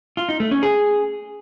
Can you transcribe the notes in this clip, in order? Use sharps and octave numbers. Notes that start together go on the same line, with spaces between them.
F4
D#4
A3
C#4
G#4